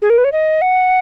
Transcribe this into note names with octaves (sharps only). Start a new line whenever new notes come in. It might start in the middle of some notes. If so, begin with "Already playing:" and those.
G#4
A#4
B4
C#5
D#5
F#5